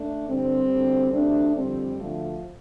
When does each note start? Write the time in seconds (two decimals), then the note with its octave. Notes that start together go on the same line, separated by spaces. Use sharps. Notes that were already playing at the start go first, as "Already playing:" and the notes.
Already playing: A3 D4
0.28 G2 D3 G3 C4
0.71 D2 D3
1.14 D2 C3 A3 D4
1.56 F2 D3 G3 C4
1.99 D2 D3 F3 A3